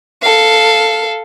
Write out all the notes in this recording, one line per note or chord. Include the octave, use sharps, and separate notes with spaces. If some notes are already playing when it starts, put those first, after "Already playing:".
A4 F5